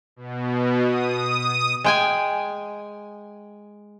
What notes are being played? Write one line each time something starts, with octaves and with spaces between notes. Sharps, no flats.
B2
D#6
G#3 G5 G#5